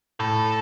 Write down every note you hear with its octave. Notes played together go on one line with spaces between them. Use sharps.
A2 A4